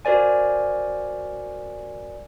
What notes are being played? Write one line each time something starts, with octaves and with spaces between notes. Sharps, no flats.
F#4 A#4 C5 D5 G#5